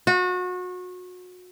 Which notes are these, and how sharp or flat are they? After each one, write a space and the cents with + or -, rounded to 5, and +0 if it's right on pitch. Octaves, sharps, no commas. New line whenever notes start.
F#4 -30